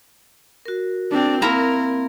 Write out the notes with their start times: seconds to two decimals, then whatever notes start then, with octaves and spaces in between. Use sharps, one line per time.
0.66 F#4 A#4
1.11 C4 D4
1.42 A#3 C4 E4 A#4 A#5